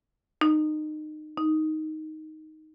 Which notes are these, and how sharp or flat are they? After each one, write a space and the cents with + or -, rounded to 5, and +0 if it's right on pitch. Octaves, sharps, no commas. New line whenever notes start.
D#4 -25
D#4 +5